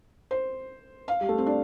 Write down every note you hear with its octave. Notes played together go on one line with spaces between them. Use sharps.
C5
F5
G3
A3
C4
D4